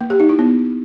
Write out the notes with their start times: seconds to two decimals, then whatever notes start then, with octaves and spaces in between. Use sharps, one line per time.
0.01 A#3
0.10 G4
0.20 D#4
0.29 E4
0.39 B3